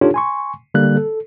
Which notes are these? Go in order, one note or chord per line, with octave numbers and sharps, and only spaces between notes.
D4 D#4 F4 G4 A4 C#5
G#5 C6 C#6
D3 G3 A#3 F#6
A4